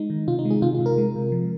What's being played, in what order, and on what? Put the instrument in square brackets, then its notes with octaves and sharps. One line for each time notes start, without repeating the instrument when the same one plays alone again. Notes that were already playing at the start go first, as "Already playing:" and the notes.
Already playing: [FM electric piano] G#3 D#4
D#3
C3 F4
D#4
G#3
G#4
C3 F4
F4
C3
A#4
G#3
C3
F3